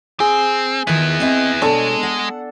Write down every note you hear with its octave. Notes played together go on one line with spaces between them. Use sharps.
C4 G#4
D#3 B3 E4 F4
C4 D#5 E5
B2 G#3 D4 A4 C#5 G#5
F#5